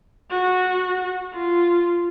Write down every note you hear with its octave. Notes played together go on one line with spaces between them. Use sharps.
F#4
F4